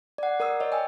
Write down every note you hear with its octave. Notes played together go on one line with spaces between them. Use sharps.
D5 F#5
A#4 D5 D#6 E6
C#5 D#5
G5 G#5 E6